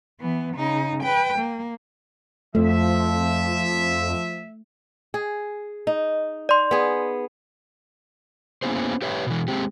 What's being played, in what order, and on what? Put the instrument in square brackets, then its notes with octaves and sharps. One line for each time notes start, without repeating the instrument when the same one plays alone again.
[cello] E3 B3
C#3 D#4
B4 G5
A#3
[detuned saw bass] F2 [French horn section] F3 [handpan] A3 [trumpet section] E5
[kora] G#4
D#4
[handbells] D5 C6
[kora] B3 G#4
[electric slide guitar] A#3 B3 C#4 E4 G#4 C5
G4 B4 C#5 E5
B2 E3
G#3 C4 G4